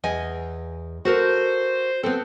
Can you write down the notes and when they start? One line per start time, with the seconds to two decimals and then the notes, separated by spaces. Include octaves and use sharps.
0.04 E2 D#5 G#5
1.05 F#4 A4 A#4 C5
2.03 B3 C4 A4